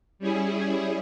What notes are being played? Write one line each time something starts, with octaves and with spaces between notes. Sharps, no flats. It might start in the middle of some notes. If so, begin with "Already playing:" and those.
G3 C#4 E4 G#4